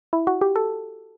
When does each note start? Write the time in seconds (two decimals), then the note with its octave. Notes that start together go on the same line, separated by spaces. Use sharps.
0.13 E4
0.27 F#4
0.41 G4
0.56 A4